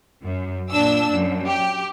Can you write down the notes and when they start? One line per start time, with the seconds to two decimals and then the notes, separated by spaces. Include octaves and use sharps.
0.24 F#2
0.70 A#2 D4 E6
1.14 F#2
1.47 G4